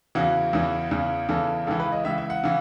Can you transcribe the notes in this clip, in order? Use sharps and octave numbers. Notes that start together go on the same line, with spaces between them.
E2 C#3 E3 F#4
E2 C#3 E3
E2 C#3 E3
E2 C#3 E3 A4
C#2 C#3 E3 A4
B4
D#5
C#2 C#3 E3 E5
E5
F#5
C#3 E3